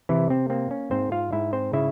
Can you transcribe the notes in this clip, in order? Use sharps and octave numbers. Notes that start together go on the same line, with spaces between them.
C3 E3 E4
C4
A#3 C4
C#4
G#2 C4 C5
F4 F5
G#2 E4 E5
C4 C5
C#3 E4 E5